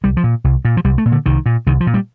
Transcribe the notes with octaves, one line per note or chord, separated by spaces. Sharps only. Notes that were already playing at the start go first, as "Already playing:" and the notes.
C2 G3
F3
A#2
C2
A#2
F3
C2 G3
A3
A#2
D3
C2 D#3
A#2
C2 D#3
F3
A#2
G3